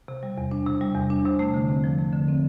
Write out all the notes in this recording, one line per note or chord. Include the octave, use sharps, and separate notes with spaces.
C3
G3
E2
D4
C3
G3
E2
D4
C3
A3
D3
C4
F3
A3
D3
C4